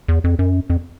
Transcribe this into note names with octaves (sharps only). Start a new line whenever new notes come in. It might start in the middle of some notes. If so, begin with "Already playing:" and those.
E2
F2
F#2
F2